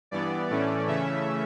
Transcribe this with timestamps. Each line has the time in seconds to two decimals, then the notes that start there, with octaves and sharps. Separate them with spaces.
0.11 G2 E3 B3 D5
0.50 A2 E3 A3 C#4
0.87 C#3 E3 A3 C#4 E5